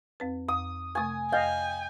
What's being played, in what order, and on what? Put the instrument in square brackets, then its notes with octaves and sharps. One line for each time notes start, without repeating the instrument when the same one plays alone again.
[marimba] F2 C4 B4
[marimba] F2 [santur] D#6
[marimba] C3 A3 C#6 [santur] G#5 D#6
[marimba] F2 A6 [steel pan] D#5 F5 [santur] G5 [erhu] G#5